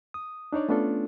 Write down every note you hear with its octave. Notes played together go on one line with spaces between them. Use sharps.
D#6
D4 D#4 C#5 D5
A3 B3 C#4 D4 F4 A4